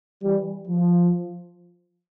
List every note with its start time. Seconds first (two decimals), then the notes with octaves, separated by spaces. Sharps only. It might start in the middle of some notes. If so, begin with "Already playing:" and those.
0.23 E3 G3
0.68 F3